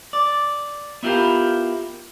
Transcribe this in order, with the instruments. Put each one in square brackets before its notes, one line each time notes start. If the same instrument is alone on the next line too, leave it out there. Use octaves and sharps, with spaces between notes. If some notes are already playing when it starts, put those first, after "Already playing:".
[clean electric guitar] D5
B3 E4 F4 G4 A#4